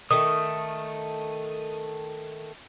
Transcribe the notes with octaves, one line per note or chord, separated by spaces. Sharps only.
D#3 A3 D#6